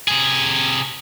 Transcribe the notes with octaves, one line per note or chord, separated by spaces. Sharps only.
C3 G#4